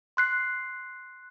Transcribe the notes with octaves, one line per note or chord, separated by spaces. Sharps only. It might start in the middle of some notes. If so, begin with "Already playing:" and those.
C6 F#6 C7